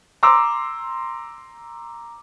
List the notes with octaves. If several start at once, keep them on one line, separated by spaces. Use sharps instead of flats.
A#5 C6 D6 E6